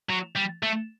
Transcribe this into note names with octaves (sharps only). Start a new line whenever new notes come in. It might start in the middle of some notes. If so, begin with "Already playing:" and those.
F#3
G3
A3